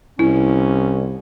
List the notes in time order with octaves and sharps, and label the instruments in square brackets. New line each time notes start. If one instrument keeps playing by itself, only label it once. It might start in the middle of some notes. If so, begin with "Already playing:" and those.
[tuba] C2 [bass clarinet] C#4 [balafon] E4